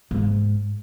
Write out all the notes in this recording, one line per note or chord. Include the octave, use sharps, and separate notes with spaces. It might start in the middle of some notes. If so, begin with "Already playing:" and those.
G#2